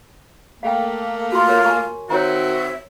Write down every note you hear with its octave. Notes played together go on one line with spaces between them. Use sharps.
A3 A#3 F5 G5
F4 F#4 C6
A#4 C#5
G#5 A5 C#6
D#3 C4 F#4 C#5 E5 A#5